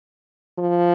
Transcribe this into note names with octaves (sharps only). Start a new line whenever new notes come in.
F3